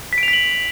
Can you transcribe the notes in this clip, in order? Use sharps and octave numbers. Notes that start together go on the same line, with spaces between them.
B6
D7
F7
B6
F#7